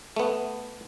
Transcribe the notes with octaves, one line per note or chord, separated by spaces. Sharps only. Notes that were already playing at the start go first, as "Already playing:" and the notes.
A3 B3